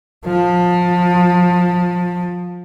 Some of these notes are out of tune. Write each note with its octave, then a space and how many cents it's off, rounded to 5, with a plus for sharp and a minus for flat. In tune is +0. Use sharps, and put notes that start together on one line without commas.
F3 +25